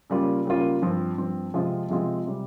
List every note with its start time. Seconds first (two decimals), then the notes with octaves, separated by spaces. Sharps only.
0.10 C#3 G3 A#3 F4
0.45 C#3 G3 A#3 F4
0.82 G2 F3 C4
1.18 G2 F3 C4
1.54 C3 F3 G#3 C4 F4
1.89 C3 F3 G#3 C4 F4
2.26 C3 G3